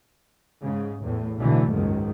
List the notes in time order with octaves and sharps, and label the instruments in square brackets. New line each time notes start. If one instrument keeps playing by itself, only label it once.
[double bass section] G#2 C#3
E2 A2
B1 D3 E3 A3
F#1 C#2 G#2 D#3